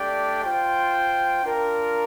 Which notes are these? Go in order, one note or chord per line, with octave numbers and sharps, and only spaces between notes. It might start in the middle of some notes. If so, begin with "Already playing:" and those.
Already playing: A3 D4 G4 D5 G5
F4 C5 G5
D4 F4 A#4